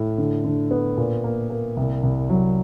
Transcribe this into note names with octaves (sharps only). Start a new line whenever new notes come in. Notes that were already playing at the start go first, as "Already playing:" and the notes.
Already playing: A2
D3
D3
B3
A#2
A#3
A#3
C2
C2
F#3